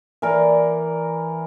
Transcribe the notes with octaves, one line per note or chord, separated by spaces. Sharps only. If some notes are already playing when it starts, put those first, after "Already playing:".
E3 A#4 D5